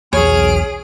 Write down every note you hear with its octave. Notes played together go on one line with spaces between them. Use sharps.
B1 E2 G#4 C#5 F6 D7